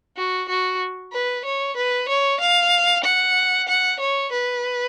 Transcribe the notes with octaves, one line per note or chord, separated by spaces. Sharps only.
F#4
F#4
B4
C#5
B4
C#5
F5
F#5
F#5
C#5
B4